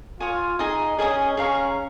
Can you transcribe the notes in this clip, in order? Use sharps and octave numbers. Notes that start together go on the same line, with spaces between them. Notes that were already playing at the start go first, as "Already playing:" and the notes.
F4 C#5 G#5 D#6
D#4 G#4 D#5 G#5 D#6
C#4 G#4 D#5 G#5 D#6
C#4 G#4 F5 A#5 C#6